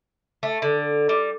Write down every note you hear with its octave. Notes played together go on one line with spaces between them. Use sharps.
A3
D3
G3